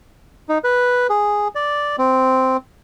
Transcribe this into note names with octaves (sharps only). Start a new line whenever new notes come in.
D#4
B4
G#4
D5
C4